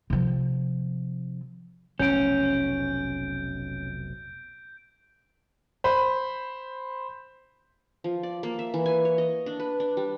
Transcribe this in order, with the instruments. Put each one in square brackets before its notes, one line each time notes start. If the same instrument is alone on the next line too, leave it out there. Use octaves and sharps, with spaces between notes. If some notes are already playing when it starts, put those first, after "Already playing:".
[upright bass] C3 F3
[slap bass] F1 B1 [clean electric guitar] C#4 [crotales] G6 D7
[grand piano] C5 B5
[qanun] F3
D5
A#3
E5
E3
G#5
C#5
D#5
D4
B4
D4
G3